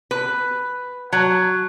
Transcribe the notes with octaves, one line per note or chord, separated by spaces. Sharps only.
B4
F#3